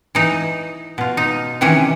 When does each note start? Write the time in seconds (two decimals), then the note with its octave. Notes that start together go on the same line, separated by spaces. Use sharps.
0.15 E3 D#4
0.98 B2 F4
1.17 D#4
1.61 C3 D#3 E3 C#4